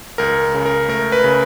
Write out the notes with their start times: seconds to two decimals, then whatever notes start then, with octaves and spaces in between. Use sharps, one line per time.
0.18 C#2 A#4
0.54 C#3
0.66 A#4
0.88 A3 A#4
1.12 B4
1.24 C#3